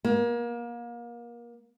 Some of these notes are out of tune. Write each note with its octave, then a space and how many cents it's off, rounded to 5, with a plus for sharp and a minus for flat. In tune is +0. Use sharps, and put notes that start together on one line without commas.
A#3 +30